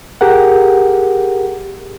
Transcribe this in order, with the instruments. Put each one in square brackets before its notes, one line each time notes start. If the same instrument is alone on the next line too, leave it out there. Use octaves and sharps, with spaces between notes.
[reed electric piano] G4 G#4 A#4 F#5